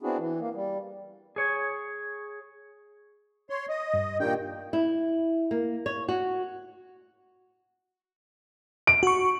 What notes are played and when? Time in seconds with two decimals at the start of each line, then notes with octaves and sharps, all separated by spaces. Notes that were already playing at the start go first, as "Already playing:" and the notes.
0.02 B3 C4 D4 E4 F#4 G#4
0.18 E3
0.40 A#3
0.54 G3
1.36 G#4 C#5
3.50 C#5 C6
3.69 D#5
3.94 G2
4.20 A#2 D#3 D4 G4 D5 G5
4.73 E4
5.51 A#3
5.86 C#5
6.08 F#4
8.87 D7
9.03 F#4 C#6